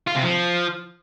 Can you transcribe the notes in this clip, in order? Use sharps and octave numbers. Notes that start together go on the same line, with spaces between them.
F4
C3
F3